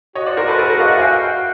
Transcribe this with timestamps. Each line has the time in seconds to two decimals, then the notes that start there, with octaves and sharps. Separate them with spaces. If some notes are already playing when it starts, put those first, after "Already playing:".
0.15 F#4 C#5 D#5
0.26 C5 D5
0.37 A#4 C5
0.48 A4 B4
0.59 G#4 A#4
0.70 A#4 C5
0.80 D#5 F5
0.91 E5 F#5
0.98 G#5
1.02 F#4 F5 G5